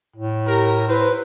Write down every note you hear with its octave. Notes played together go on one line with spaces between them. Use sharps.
A2
G4 A#4 A#5
E4 B4 C5